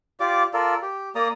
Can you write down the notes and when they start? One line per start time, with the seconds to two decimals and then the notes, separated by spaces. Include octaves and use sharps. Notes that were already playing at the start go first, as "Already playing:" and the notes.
0.20 F4 G4 D5 D6
0.53 F4 A4 A#4 D5
0.82 G4
1.15 A#3 D5 A#5 D#6